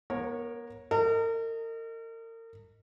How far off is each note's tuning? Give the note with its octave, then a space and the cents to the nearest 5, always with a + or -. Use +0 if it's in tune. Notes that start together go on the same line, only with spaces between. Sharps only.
B3 -40 A#4 +0 C#5 -15
A#4 -40 D#5 +0